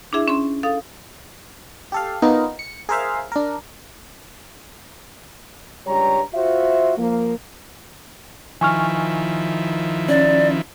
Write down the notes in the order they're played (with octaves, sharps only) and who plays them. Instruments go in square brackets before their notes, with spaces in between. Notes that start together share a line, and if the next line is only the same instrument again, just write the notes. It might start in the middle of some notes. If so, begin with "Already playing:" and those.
[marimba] D4 E4 G#4 E5
C#4 C6
A4 F5 D#6
[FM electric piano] G4 A4 F5
B3 D#4 F4 A#4
C#7
G#4 A#4 C5 E5 F5
D4 A#4
[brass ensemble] C#2 G2 G3 G4 C#5 A#5
F4 F#4 C5 E5
F3 A#3
[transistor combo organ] D#3 F3 E4 [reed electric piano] G#5 C#6 F6
[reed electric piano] C#4 [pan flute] D5